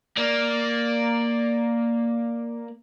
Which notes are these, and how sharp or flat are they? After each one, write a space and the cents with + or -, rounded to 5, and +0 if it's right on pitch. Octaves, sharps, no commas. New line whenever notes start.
A#3 +0 D5 +0